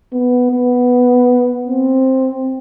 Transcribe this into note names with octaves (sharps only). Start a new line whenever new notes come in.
B3
B3
C4